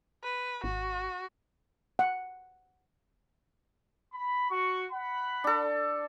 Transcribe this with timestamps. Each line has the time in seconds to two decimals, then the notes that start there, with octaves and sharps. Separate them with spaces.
0.24 B4
0.64 G#1 F#4
1.99 F#5
4.12 B5
4.50 F#4 C#6
4.92 F#5 B5
5.44 D4 A4